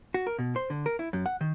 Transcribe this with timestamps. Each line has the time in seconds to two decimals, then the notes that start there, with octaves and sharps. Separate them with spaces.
0.14 F#4
0.27 A#4
0.39 B2
0.56 C5
0.70 D3
0.86 A#4
0.99 E4
1.13 F#2
1.26 F#5
1.41 D#3